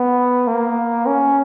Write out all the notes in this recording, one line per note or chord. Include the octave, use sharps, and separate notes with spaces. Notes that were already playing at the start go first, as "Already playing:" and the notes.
Already playing: B3
A#3
C#4